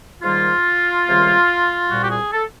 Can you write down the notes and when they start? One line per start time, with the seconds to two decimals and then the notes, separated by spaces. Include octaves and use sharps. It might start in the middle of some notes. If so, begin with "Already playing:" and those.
0.22 G#2 D#3 G3 A#3 F4
1.06 C#2 C3 D#3 G3 A#3
1.90 C2 A#2 G3 F#4
2.02 G4
2.11 G#4
2.32 A4